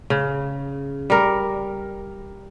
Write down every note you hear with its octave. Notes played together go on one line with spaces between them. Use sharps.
C#3
G3 A#4